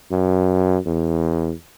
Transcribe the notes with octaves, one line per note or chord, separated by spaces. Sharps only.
F#2
E2